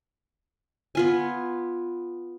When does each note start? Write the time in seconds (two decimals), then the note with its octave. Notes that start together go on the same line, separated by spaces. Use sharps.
0.95 B3 F4 G#5